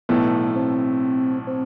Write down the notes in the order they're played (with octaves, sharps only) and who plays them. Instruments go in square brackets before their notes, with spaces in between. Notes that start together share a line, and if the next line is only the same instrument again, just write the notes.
[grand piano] B1 A2 E3 A3 [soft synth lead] B3
[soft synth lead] C4
C4